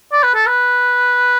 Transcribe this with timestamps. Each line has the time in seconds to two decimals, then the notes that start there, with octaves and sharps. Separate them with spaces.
0.12 D5
0.23 B4
0.35 A4
0.47 B4